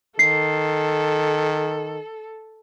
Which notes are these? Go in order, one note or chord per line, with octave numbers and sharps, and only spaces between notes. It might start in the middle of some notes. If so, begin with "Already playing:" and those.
D#3 A4 C7